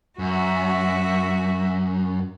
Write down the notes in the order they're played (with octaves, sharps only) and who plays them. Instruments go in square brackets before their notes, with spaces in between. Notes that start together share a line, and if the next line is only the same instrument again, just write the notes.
[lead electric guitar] F#2 [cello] F#4 E5